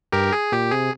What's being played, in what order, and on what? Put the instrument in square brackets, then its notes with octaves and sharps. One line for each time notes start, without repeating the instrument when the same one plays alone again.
[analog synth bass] G2 [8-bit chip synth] G4 A#4
[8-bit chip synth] G#4
[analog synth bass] A#2 [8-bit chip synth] G4
[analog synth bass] C3 [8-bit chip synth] G#4